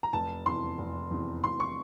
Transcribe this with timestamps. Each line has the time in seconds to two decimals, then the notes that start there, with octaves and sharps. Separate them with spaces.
0.03 A#5
0.13 F1 A5
0.46 E2 C3 C6
0.78 F1
1.11 E2 C3
1.43 F1 C6
1.60 C#6